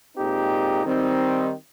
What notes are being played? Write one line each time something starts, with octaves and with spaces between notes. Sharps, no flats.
A#2 G#3 C4 D#4 G4
D#3 G3 C4 D#4